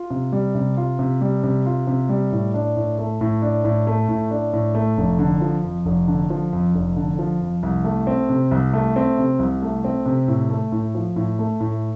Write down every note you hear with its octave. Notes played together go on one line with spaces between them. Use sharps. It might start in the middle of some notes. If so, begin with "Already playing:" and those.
Already playing: F4
C3
G3
C3
F4
C3
G3
C3
F4
C3
G3
A2
D4
A2
A3
A2
D4
A2
A3
A2
D4
A2
A3
F1
D3
F3
F2
F1
D3
F3
F2
F1
D3
F3
F2
C2
A3
C4
C3
C2
A3
C4
C3
C2
A3
C4
C3
A2
A3
A2
F3
A2
A3
A2